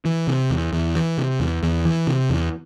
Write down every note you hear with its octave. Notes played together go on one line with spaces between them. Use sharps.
E3
C3
E2
E2
E3
C3
E2
E2
E3
C3
E2